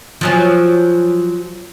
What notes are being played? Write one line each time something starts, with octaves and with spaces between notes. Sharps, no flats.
F3 F#3 G#4